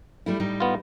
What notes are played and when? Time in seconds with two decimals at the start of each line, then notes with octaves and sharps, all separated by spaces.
0.26 G3 A3 E4
0.40 A2 G3 D#4
0.60 B3 F4